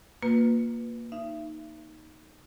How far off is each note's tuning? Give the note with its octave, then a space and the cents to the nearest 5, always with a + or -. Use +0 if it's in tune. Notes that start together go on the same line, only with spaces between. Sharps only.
A#3 +0 F4 +25 B4 +0
D#4 +0 E5 +35